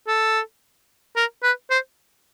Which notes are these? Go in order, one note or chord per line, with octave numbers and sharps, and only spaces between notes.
A4
A#4
B4
C5